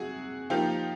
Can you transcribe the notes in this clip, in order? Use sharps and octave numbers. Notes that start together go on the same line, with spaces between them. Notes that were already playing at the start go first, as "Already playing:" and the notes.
Already playing: C3 F#4 G#4
F3 A#3 D#4 F4 G4